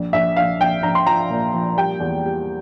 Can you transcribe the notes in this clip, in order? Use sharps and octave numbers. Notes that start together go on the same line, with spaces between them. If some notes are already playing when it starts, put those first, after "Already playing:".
Already playing: A#1
A#1 E5
A#1 F5
A#1 G5
A#1 A#5
C6
F3 A#5
A#2
F3
G3 G5
E2
G3